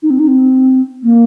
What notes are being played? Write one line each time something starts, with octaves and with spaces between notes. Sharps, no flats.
D#4
C4
D#4
C4
A#3